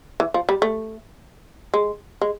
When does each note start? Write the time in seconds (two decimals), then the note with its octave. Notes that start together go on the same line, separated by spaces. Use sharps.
0.20 E3
0.34 F3
0.49 G3
0.62 A3
1.74 G#3
2.22 G#3